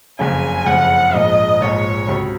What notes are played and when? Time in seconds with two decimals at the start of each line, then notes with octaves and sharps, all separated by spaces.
0.19 F#1 F2 C#3 G#5
0.66 F#1 F2 C#3 F#5
1.14 A#1 G#2 F3 D#5
1.61 A#1 G#2 F3 C#5
2.08 C#2 C3 F#3